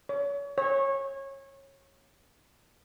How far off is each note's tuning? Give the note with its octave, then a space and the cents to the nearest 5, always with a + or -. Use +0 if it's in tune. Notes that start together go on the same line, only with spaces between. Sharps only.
C#5 +35
C#5 -25